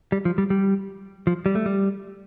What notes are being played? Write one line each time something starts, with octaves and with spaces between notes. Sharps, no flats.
G3
F3
G3
G3
F3
G3
A3
G3